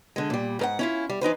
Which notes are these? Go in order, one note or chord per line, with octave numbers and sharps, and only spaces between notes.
D3 G#3
A#2 G3
G#2 A#4 F#5
C#4 E4 F4
G3
E3 D#4 B4 C5